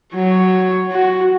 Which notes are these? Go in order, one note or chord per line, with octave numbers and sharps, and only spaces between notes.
F#3 C#5
F#4